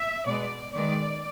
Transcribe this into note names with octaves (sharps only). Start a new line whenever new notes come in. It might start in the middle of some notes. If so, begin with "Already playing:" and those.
Already playing: E5
B2 G#3 B3 D5
D#3 G#3 B3 D5